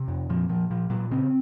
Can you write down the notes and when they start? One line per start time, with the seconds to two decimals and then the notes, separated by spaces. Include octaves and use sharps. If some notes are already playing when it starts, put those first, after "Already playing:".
Already playing: C3
0.08 F2
0.29 A#2 F3
0.49 A#2 F3
0.71 A#2 F3
0.90 A#2 F#3
1.11 C#3 C4